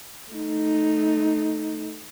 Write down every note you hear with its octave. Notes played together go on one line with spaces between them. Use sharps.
A3 D#4